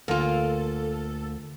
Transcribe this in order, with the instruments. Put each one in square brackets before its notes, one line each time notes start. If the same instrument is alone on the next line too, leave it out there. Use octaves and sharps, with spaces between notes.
[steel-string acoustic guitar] D2 [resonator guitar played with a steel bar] A#3 F4 [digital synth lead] A4